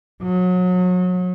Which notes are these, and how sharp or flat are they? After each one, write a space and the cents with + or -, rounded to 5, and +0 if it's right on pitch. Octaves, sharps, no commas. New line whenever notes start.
F#3 -30